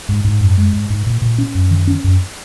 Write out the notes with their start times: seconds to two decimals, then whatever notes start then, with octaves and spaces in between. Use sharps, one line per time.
0.09 G#2
0.25 G#2
0.40 F#2
0.57 G#3
0.73 G#2
0.90 G#2
1.07 A#2
1.22 A#2
1.38 C#4
1.55 F#2
1.70 D#3
1.87 C#4
2.04 F#2